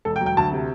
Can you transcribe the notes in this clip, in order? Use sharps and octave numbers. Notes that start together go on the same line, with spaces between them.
E1 A4
G5
F#3
G5
D2 A5
C3